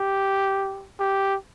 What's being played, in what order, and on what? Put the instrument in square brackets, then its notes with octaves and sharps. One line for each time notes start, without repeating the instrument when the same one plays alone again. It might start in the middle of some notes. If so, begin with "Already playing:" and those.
Already playing: [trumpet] G4
G4